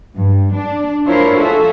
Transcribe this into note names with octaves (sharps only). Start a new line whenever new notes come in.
G2
D4
D4 E4 F4 A#4 C5 C#5
F4 F#4 G#4 A4 E5